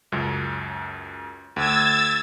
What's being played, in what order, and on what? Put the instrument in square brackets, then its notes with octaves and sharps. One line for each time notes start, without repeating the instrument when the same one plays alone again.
[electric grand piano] C#2 F#2
[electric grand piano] D2 [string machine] E6 G#6 A6